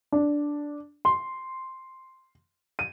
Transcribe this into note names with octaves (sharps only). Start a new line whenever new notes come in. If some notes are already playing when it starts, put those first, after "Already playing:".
D4
C6
D#7